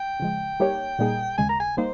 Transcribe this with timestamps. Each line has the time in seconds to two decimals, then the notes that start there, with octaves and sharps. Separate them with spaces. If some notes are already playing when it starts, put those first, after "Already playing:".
Already playing: G5
0.20 C#3 F3 G#3
0.60 G3 A#3 D#4 G4 C#5
0.99 A#2 G3 A#3 D#4 G#4
1.38 D#2 C#3 G#3 G#5
1.49 A#5
1.60 G#5
1.77 G3 A#3 D#4 C5